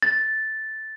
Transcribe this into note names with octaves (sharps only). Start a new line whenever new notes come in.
A6